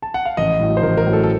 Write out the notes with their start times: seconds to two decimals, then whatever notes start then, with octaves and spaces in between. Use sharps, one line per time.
0.02 A5
0.14 F#5
0.25 F5
0.37 A1 D#5
0.60 A2 F#3
0.77 C5
0.82 A1 A#4
0.97 A#4
1.06 A2 F#3
1.13 A4
1.23 A4